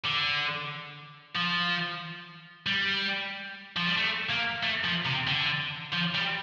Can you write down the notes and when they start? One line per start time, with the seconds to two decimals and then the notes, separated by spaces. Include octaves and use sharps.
0.05 D3
1.36 F3
2.67 G3
3.76 F3
3.86 G3
3.97 A3
4.30 A#3
4.63 A3
4.84 F3
5.06 C3
5.27 D3
5.93 F3
6.15 G3